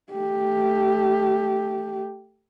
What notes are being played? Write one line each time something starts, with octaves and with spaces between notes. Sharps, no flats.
A3 G4